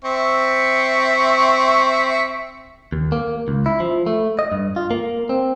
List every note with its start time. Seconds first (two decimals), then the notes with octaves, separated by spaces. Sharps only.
0.04 C4 E5 C#6
2.92 D#2
3.12 A#3
3.48 C#2
3.66 E4
3.80 F3
4.06 A3
4.39 D#5
4.52 G2
4.76 F4
4.91 A#3
5.29 C4